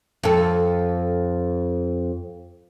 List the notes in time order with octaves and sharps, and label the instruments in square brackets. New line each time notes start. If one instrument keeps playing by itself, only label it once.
[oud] F2 A4